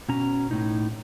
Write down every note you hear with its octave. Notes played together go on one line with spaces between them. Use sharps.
B2 C#4 A#5
A2 D#4